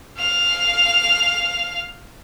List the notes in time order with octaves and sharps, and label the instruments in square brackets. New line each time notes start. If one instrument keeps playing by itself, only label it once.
[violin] F5 F7